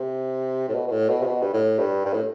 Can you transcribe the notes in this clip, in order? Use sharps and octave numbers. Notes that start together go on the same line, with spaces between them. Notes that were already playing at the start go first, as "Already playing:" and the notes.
Already playing: C3
A2
B2
B2
A2
B2
C3
B2
G2
A2
G2
G2
A2